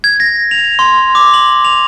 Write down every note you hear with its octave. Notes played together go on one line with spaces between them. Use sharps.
G#6
A#6
F7
C6
D6
F#7
F7